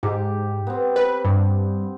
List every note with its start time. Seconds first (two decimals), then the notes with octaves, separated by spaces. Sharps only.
0.03 G#2 G4
0.67 B3 C4
0.96 B4
1.25 G2